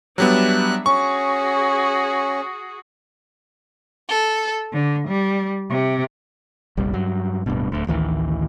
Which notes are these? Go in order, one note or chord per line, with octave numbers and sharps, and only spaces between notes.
F#3 G3 B3 D4 E5 F#6
C#4 F#4 G#4 C#6
A4
D3
G3
C3
F1 A#1 G3
G2 F#3
D1 G2 B2
D1 D2
A1 D2 D#3 E3